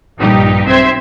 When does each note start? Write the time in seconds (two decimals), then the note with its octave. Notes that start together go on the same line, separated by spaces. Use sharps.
0.17 A#1 G2 D#4 G4
0.66 B1 C4 C5 E5 C6 G#6